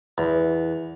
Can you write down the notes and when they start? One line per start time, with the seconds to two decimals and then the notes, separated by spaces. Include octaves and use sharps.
0.18 E2